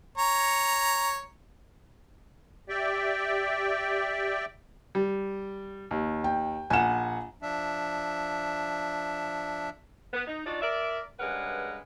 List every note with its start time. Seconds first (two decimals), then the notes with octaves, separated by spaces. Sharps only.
0.18 C#5 A#5
2.69 G4 D5 E5 G5
4.95 G3
5.91 D#2
6.24 G5
6.70 A#1 F#5 G#5 E7
7.42 F3 D4 E5
10.14 B3
10.27 D#4
10.46 D4 D#4 F4 F#4 D5
10.62 A#4 D5 E5
11.19 G2 C#3 G#3 A#4 B4 F#5